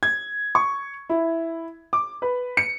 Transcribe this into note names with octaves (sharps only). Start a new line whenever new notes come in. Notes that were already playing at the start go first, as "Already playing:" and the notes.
G#6
C#6
E4
D6
B4
C#7